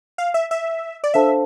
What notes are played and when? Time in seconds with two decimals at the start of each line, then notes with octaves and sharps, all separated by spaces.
0.18 F5
0.34 E5
0.51 E5
1.04 D5
1.14 D4 A4 C5 E5 F5 A5